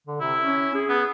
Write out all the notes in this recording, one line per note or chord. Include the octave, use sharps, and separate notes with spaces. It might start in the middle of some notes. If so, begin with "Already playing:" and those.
D3
C3 E4
C#4
G#4
B3